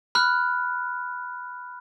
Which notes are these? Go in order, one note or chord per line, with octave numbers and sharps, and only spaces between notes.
B5 F6 F#6